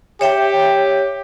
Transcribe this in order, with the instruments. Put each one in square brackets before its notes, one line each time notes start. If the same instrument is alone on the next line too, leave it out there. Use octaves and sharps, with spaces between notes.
[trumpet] G4 [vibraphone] C#5 E5 G5